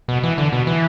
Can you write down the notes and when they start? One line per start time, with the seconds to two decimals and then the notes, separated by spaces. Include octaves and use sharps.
0.08 B2
0.23 E3
0.38 D3
0.53 B2
0.67 E3